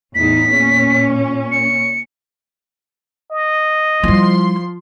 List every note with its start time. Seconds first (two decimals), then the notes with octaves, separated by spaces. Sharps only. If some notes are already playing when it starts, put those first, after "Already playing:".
0.15 E2 A2 D#4 B6
0.53 A#2 C#4
1.52 C#7
3.31 D#5
4.04 F3 G3 E4 C6